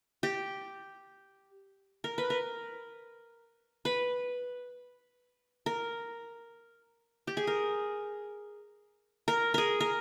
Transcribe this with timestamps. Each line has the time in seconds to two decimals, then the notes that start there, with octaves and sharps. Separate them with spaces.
0.23 G4
2.04 A#4
2.18 B4
2.30 A#4
3.85 B4
5.66 A#4
7.27 G4
7.37 G#4
7.47 A#4
9.28 A#4
9.54 G#4 A#4
9.81 A#4